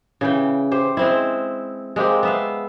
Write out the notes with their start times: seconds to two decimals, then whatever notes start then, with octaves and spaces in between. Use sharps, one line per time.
0.21 C#3 E3 G5
0.71 G4 C5
0.97 G#3 C4 E4
1.96 G#3 A#3 C4 G4
2.23 B3 E5 F5